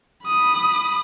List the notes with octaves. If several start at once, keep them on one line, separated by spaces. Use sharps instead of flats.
B5 D#6